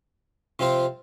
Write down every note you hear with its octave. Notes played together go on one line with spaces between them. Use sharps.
C3 F3 C4 F4 C5